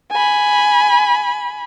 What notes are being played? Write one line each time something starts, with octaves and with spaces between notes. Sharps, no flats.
G#5 B5